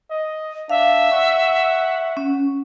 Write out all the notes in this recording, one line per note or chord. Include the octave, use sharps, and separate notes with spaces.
D#5
D4 E5 F5
F#5 C#6
C#4